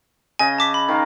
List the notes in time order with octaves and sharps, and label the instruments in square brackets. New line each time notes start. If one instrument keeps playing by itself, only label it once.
[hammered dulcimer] C#3 D#5 [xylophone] G#5
[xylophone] A5 D6 B6
B5
[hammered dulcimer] D#3 F5 A#5